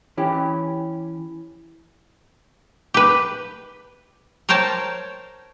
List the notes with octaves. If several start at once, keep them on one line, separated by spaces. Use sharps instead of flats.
E3 C#4 G4
G4 B4
A#4 C5 C#5 G5 A5